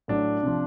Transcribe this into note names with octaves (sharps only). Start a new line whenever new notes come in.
A2 F#3 D4
C3 F3